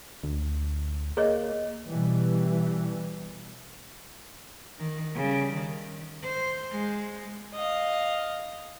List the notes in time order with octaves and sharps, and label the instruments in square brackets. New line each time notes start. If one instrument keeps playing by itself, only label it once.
[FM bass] D2
[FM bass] A#3 [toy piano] G#4 C#5 D#5
[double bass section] B2 E3 G3
[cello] D#3
C#3 G3
D#3
C5
G#3
[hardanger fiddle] D#5 F5